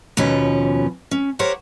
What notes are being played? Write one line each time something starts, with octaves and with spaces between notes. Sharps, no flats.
D#2 B2 F3 C#4
C#4
G4 A#4 C5 C#5 F#5